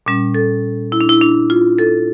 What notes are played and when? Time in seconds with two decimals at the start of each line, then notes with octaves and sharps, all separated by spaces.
0.06 A#2 G3 C#4
0.34 A4
0.92 E4
1.01 D4
1.09 E4
1.21 D4
1.50 F4
1.78 A4